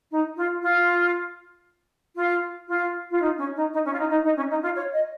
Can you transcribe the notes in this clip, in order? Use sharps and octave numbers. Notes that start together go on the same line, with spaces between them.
D#4
F4
F4
F4
F4
F4
D#4
C#4
D#4
D#4
C#4
F4
D#4
D#4
D#4
C#4
D#4
F4
C#5
D#5